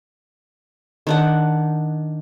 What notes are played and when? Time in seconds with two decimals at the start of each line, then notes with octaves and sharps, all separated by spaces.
1.07 D#3 D4 F#5